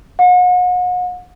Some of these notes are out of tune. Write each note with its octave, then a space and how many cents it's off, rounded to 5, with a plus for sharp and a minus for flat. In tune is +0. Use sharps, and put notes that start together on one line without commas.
F#5 -40